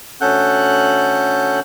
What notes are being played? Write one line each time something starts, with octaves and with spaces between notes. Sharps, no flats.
D2 C#4 A4 F#5 F#6 G6